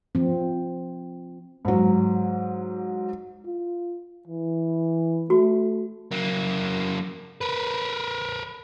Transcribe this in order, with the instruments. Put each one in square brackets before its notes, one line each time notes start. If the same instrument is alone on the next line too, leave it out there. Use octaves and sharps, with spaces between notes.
[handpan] F3 C4
[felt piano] G#2 F#3
[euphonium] F4
E3
[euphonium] A3 [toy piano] F#4
[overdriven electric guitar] F#3 A#3
A#4 B4